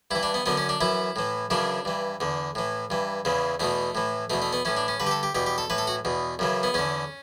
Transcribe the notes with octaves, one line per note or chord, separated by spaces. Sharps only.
G2 E3 E4
D4
B3
F#2 D3 B3
C#4
D4
F#2 E3 E4
A2 E3
F#2 C#3 E3 D4
G2 E3
E2 D3
A2 E3
G2 E3
E2 C#3 E3
E2 B2 A3
A2 E3
E2 B2 A3
A3
B3
A2 E3 C#4
D4
C#4
G2 D3 B4
G4
A4
G4
E2 B2 G4
G4
A4
A2 E3 B4
A4
F#4
E2 B2
F#2 C#3 E3
B3
E2 D3 C#4